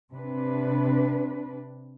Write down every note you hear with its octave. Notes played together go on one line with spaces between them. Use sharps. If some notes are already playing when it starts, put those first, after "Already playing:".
C3 D4 B4